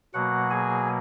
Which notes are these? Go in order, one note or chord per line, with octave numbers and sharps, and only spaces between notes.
B2 F#3 A#3 F#4 F#5
G#4 G#5